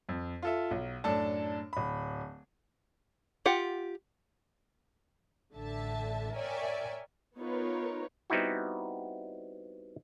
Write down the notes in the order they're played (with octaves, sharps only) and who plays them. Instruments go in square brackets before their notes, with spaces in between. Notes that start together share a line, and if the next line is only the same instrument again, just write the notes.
[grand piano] F2
F4 A4 E5
B1
F#2 A2 D4 A4 A5
D1 B5
[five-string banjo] F4 G4 F#5
[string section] A1 D3 E5 A5
A#4 C#5 D5 E5 G5 G#5
[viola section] B3 D#4 F4 A#4 B4 C#5
[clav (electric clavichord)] G3 B3 C4 D#4 E4 F#4